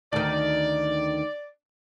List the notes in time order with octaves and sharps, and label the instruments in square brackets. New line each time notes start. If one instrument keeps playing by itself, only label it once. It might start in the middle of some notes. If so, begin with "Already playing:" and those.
[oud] D2 D#3 [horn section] D5